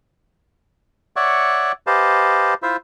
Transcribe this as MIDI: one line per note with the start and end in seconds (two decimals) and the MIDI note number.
1.16 1.72 73
1.16 1.72 74
1.16 1.72 76
1.16 1.72 78
1.16 1.72 85
1.87 2.54 67
1.87 2.54 71
1.87 2.54 72
1.87 2.54 75
1.87 2.54 77
1.87 2.54 81
2.63 2.77 64
2.63 2.77 65
2.63 2.77 72
2.63 2.77 76